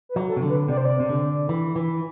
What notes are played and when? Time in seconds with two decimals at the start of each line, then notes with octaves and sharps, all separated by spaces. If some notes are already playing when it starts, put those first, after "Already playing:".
0.09 B4
0.16 F#3
0.28 A4
0.37 C3
0.42 D3
0.49 B4
0.68 C3 D5
0.77 C5
0.85 D5
1.00 C3
1.09 D3
1.49 E3
1.76 E3